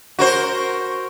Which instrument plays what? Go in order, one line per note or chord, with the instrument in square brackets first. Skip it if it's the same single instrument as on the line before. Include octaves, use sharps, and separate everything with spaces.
[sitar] F#4 A#4 C5